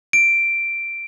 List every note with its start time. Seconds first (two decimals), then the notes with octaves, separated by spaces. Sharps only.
0.13 D7